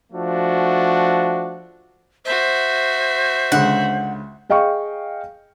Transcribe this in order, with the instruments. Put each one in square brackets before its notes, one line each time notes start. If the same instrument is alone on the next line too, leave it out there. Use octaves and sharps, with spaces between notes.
[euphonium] F3 [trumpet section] A3 D4 F#4
[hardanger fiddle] F#4 E5 [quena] C5
[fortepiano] C#2 D3 [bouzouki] F#5
[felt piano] G#4 D#5 F5 G5 C#6